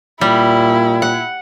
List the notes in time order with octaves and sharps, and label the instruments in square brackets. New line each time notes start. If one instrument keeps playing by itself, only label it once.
[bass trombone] A#2 [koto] G3 [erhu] E4
[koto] F#5